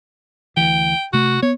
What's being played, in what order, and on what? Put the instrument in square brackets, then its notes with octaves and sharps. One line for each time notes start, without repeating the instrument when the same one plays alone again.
[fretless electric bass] D2 E3 [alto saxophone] G5
[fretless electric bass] C3 A3 [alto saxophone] F#4
[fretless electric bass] B3 [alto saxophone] C#5